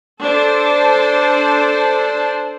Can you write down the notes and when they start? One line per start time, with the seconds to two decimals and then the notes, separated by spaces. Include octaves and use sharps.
0.21 D4 A4 C5 A5